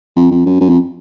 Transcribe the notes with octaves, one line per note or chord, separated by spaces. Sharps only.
F2
F2
F#2
F#2
F2